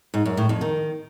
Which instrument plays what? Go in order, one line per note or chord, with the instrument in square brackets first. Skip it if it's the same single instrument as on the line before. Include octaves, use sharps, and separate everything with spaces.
[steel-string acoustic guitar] G#2
F#2
A2
F2
D#3